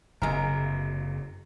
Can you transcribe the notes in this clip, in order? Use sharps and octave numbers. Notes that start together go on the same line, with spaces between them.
F#1 C3 G#3 A#4